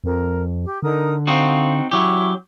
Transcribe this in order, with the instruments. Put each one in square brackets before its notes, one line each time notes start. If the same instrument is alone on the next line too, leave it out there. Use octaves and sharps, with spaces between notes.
[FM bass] F2 [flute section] A#4
[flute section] G4
[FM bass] D3 [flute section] D#4 A#4 D#6
[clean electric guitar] C4 D#4 F#4 [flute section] C5 F5
[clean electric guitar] F#3 G4 [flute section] C#4 E4 C#6